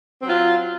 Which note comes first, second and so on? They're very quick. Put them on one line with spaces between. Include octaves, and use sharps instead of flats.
C4 F#3 F4